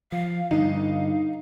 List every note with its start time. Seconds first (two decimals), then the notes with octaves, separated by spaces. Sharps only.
0.12 F3 F5
0.51 G2 D3 D#4 F5